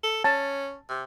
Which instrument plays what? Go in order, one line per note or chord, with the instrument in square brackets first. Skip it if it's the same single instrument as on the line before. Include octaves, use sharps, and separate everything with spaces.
[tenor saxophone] A4
[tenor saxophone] C#4 [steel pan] A5
[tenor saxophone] C3